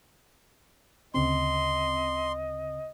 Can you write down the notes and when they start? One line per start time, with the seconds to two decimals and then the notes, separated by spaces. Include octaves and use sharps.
1.14 D2 C#3 C4 D#5 C6